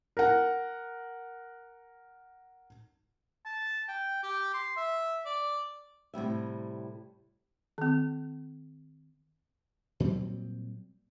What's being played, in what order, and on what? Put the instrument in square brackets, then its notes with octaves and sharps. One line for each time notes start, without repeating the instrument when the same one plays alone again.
[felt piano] A#4 F#5
[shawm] A5
G5
G4
C6
E5
D5
[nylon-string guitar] A2 C3 G3 E5
[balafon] D#3 C4
[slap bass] A#2 F#3 G3 C4